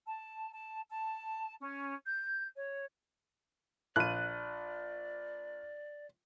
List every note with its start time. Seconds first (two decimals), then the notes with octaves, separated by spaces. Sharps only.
0.06 A5
0.52 A5
0.90 A5
1.60 C#4
2.06 G6
2.56 C#5
3.96 A#1 D5 F#6 D#7